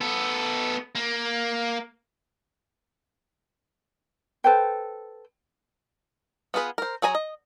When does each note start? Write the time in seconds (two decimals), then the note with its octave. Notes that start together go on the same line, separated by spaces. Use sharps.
0.01 B3 A4
0.95 A#3
4.44 A4 B4 C5 G5
6.54 B3 F4 G#4 B4
6.78 A#4 C5
7.02 F#3 G#4 G#5 A#5
7.15 D#5